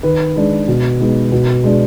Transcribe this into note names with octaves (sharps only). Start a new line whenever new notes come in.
D#3 B4
G#3 D4
B2
G#3 B3 D#4
B2
G#3 D4